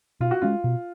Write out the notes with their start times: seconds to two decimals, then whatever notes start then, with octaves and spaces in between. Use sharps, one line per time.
0.20 B2 F4
0.31 F#4
0.42 G#3 C#4 F4
0.64 B2